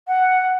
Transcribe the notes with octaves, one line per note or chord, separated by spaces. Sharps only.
F#5